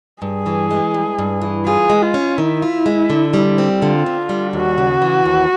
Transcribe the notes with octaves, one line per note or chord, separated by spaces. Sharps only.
G2 G#4
E3
G#3
G2
G2
E3
F4 G#4
G#3
F4
C#4
D#3 E4
F4
G#3
D3
G3
C4
D3 F4
D3
G3
D#2 F#4
C#3
E3
D#2